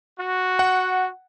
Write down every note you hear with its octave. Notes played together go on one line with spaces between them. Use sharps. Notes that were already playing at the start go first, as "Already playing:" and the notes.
F#4
F#5